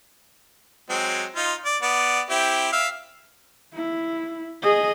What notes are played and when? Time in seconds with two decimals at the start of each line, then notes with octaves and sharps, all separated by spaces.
0.90 F#3 G#3 C4
1.36 D#4 F4
1.66 D5
1.82 B3 D5
2.30 C4 E4 G4
2.72 E5 F5
3.74 E4
4.63 G#4 D#5